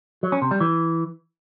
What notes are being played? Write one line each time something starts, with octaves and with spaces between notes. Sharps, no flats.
F#3
C#4
C3
G3
E3